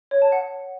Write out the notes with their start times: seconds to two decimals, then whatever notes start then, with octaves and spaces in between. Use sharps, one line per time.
0.11 C#5
0.22 A5
0.32 F#5